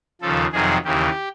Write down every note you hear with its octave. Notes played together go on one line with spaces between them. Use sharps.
D#2 C#3 F3 A4
F2 C3 D#3 F#3 G#4
D#2 C#3 E3 G4